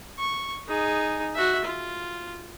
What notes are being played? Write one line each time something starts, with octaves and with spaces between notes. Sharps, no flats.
C#6
D#4 G#4
F#4 E5
F4